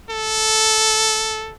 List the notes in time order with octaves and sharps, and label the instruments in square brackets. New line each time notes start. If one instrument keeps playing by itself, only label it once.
[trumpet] A4